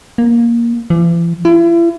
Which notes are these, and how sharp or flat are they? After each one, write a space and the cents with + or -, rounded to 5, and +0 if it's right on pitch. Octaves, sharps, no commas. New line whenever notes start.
A#3 +10
E3 +45
E4 +40